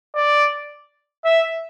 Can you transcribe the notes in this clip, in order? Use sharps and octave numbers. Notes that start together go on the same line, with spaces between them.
D5
E5